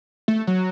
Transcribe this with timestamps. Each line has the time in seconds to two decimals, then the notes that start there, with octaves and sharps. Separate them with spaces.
0.28 A3
0.47 F#3